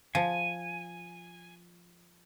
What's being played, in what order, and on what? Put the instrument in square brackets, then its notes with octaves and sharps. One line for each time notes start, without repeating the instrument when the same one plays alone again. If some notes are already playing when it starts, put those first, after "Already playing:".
[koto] F3 [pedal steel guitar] G#5